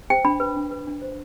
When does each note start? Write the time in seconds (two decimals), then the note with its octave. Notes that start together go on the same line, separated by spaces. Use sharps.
0.10 C5 G5
0.25 D4 B5
0.40 B4
0.56 D4
0.71 B4
0.87 D4
1.02 C5